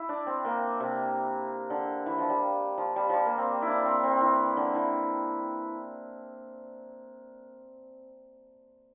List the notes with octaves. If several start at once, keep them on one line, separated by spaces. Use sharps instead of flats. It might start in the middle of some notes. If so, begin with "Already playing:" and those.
Already playing: E4
D4
C4
A#3
C3
D3
E3
F3
G3
F3
G3
F3 G3
A#3
C4
E4
D4
C4
C4
E3
D3
E3